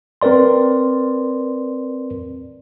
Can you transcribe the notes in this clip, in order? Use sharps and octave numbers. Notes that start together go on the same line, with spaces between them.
C4 A#4 B4 D5 C6